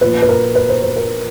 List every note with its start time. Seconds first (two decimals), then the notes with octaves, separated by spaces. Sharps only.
0.01 A#2 F3 A#3 B4
0.22 B4
0.29 A#4
0.55 B4
0.69 C5
0.83 C5
0.96 A#4